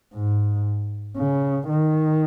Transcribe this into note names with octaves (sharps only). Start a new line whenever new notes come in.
G#2
C#3
D#3